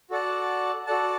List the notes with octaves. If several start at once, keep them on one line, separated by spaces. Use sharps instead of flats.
F#4 A4 D5 F#5 A5
F#4 A4 D5 F#5 A5